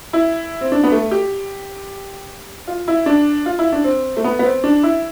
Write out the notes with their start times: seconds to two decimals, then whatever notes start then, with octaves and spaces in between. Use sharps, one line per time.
0.13 E4
0.61 C4
0.72 D4
0.84 B3
0.92 A3
1.11 G4
2.68 F4
2.88 E4
3.06 D4
3.46 F4
3.59 E4
3.72 D4
3.84 C4
4.17 A3
4.24 B3
4.39 B3
4.44 C4
4.64 D4
4.83 E4